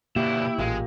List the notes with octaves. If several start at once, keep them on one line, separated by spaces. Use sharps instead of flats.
B2 D3 A#3 E4 G4
A1 A#2 G#3